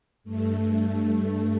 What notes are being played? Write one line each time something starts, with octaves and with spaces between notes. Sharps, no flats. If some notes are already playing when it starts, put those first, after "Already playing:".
G2 A3